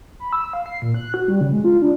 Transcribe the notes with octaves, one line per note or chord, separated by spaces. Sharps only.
B5
E6
F5
C7
A#2
F#6
F#4
G3
C#3
G#3
F4
D4